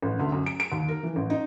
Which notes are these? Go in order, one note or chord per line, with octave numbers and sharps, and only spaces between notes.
A1
D2
F#2
D7
D7
D#2
A#4
E3
A1
D#4